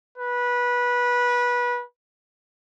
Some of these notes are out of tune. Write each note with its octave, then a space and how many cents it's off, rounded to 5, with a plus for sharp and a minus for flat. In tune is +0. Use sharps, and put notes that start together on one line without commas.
B4 -20